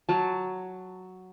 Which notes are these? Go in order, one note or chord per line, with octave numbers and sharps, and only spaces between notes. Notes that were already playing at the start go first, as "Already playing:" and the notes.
F#3 A5